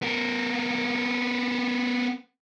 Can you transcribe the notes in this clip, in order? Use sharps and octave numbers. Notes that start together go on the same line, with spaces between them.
B3 A#4